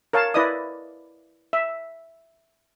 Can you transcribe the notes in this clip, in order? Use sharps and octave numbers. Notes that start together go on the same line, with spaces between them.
A#4 C#5 F5 A5
E4 B4 D5 D#5 D#6
E5